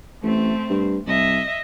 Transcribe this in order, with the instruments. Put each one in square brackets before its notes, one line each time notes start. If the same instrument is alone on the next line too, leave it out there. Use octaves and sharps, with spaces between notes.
[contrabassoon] A1 [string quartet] A3 C4
[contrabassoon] G2
[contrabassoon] C2 [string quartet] D#5 E5